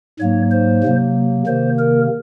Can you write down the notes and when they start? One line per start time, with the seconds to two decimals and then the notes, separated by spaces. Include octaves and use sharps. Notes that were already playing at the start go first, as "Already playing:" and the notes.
0.19 G#2 F#3 A#3 C#5
0.51 C5
0.83 C3 F#3 A#3
1.46 C3 D#3 A#3 C5
1.78 A#4